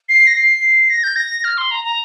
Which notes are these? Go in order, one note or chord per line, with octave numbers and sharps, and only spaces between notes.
C7
A#6
C7
A#6
G6
A#6
F6
C6
A#5
A#5